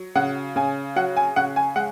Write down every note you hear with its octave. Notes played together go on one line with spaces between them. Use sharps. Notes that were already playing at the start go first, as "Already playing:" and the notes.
Already playing: F#3
C#3 F#5
C#3 G#5
F#3 F#5
G#5
C#3 F#5
G#5
G#3 F#5